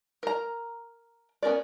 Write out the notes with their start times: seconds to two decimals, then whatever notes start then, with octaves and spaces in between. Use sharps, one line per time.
0.23 A#4 A#5
1.43 B3 C#4 A#4 D5